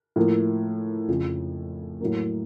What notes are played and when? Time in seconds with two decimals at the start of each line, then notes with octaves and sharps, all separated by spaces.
0.16 A2 F3 A#3
1.08 F2 C#3 F3
2.00 A2 F#3 A#3